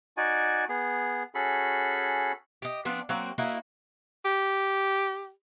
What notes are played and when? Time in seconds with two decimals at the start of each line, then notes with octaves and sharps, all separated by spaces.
0.17 D#4 F#4 D5 G#5
0.69 B3 G#4
1.35 C#4 F#4 G#4 A4 B5
2.62 G4 D#5
2.85 F3 B3 C4 D4
3.09 F#3 A#3 C4 F#4
3.38 A#3 D#4 E4 F#4
4.25 G4